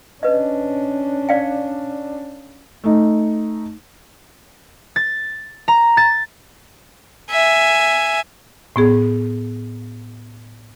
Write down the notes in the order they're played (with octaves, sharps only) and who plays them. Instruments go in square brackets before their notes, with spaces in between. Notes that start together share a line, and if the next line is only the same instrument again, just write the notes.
[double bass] C#4 D4 [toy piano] B4 D#5
[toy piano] D5 F5 G5
[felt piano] A3 D#4
[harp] A6
A#5
A6
[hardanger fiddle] E5 G#5
[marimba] A2 B3 G#4